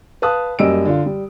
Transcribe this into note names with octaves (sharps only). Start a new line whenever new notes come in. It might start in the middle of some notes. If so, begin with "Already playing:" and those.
B4 F5 A5 D#6 F#6
F#2 G3 A#3 D#5 E6 D7
D3 F4
G3